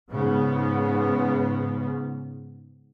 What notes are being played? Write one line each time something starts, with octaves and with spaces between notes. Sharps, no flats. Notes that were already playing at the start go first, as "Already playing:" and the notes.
G#2 C#3 B3